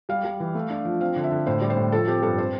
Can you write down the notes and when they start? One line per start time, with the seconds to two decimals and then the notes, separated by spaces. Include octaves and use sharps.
0.09 G3 F5
0.24 G3
0.40 E3
0.55 A3
0.70 D4
0.85 F3
1.01 C4 F5
1.16 D3
1.24 E5
1.31 D3
1.47 A2 C5
1.61 G3 D5
1.70 C5
1.77 A2
1.92 F3 A4
2.08 C4 G4
2.23 G2 A4
2.38 C4 C5